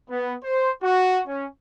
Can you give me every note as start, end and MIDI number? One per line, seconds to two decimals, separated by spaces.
0.10 0.36 59
0.44 0.71 72
0.83 1.22 66
1.28 1.47 61